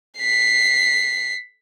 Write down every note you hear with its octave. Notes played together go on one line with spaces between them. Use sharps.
B6 C7